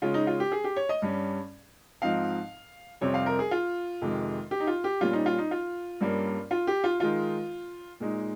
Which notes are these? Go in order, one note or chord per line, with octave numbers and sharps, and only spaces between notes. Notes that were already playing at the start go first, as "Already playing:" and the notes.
C#3 G#3 C#4 F4
D#4
F4
G4
G#4
G4
C#5
D#5
G2 G3 C#4
G#2 F3 C4 D#4 F5
F2 C3 G3 C4 C#5
F5
A#4
G#4
F4
F2 C3 D#3 G#3
G4
D#4
F4
G4
A#2 G3 C#4 F4
D#4
F4
D#4
F4
G2 G3 A#3 C#4
F4
G4
F4
D#3 G#3 D#4 F4
A#2 G#3 D#4